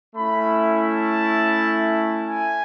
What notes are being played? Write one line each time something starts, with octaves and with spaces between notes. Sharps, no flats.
A3 C#4 E4 B5
A5
G#5